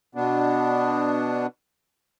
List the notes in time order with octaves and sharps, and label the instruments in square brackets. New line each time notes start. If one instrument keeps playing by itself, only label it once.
[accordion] B2 B3 D4